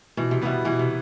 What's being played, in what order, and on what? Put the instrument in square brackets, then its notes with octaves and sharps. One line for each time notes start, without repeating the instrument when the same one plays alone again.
[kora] B2 [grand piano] E3
[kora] C3
[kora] B2 [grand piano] G3 B3 E4
[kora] B2 [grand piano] E3
[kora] C3